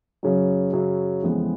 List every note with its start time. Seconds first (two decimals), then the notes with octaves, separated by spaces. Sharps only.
0.23 F#2 C#3 F#3
0.73 F#2 C#3 F#3
1.23 F2 C#3 E3 G#3 B3